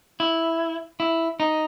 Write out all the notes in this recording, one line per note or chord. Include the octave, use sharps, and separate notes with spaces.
E4
E4
D#4